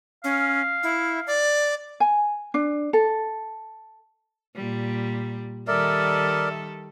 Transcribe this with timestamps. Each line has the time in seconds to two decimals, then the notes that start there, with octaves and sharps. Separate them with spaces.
0.24 C#4 F5
0.83 E4
1.27 D5
2.00 G#5
2.54 D4
2.93 A4
4.55 A#2 G3
5.68 D#3 G3 A4 A#4 D5 E5